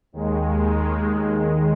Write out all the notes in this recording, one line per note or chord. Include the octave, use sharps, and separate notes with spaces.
D#2 D#3 G#3